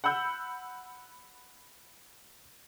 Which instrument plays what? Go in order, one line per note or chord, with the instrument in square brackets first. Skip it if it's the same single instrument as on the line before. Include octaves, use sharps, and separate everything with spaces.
[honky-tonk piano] F#5 B5 E6 G6